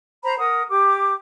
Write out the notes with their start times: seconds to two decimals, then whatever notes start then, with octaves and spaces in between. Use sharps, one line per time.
0.23 C5 A#5 B5
0.39 A#4 F#5 D#6
0.69 G4 D6